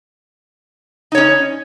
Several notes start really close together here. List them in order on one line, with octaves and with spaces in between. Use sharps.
D#4 C#5 C#4